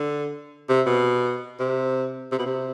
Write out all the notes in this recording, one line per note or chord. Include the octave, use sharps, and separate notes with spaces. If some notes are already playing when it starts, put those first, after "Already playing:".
Already playing: D3
C3
B2
C3
C3
B2
C3